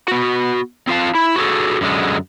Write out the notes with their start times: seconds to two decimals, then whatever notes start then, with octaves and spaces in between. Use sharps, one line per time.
0.08 B3 F#4
0.87 C4 F4 F5 A5
1.15 E4
1.36 F#4 G#4 A4
1.81 F#2 D3 G#3